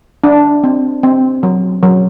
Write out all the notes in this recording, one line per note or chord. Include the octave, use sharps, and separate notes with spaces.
D4
C4
C4
F#3
F#3